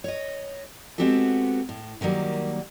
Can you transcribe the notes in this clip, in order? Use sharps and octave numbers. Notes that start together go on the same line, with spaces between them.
C#5 D#5
G#3 B3 C4 F#4 G4 A4
A2
D3 D#3 F#3 G3 A#3